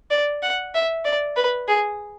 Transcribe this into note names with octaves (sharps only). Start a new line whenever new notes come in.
D5
F#5
E5
D5
B4
G#4